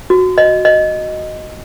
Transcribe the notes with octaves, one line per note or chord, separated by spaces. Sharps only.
F#4
D#5
D#5